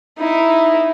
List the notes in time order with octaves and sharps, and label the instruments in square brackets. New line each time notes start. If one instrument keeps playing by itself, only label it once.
[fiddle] D#4 E4